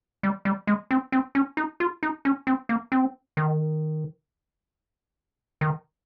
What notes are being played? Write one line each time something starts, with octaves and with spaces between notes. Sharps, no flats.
G3
G3
G#3
C4
C4
C#4
D#4
F4
D#4
C#4
C4
A#3
C4
D#3
D#3